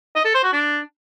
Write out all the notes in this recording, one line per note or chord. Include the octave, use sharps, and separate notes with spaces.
D#5
A4
C5
F#4
D4